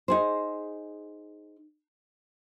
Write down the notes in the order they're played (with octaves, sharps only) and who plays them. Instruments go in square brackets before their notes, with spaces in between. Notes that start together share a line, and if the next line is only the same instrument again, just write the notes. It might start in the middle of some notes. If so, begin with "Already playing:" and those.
[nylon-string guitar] D#4 G#4 C5